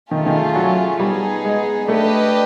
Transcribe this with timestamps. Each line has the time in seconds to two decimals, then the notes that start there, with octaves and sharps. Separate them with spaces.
0.11 D#3 A3 C#4 F4 G#4
0.26 D#3
0.56 F#3
1.00 G3 B3 D#4 G#4
1.45 G#3
1.88 A3 D4 G4 B4 D#5